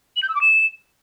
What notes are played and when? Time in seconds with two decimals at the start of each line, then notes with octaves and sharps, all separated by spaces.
0.16 F#7
0.23 G6
0.29 E6
0.35 D6
0.41 E7